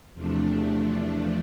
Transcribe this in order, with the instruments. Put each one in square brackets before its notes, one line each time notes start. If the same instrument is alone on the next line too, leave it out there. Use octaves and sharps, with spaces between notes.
[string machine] E2 C3 F3 A3 D4